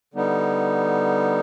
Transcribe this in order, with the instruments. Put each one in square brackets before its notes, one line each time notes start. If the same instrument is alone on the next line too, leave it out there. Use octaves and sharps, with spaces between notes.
[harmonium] D3 G3 B3 D#4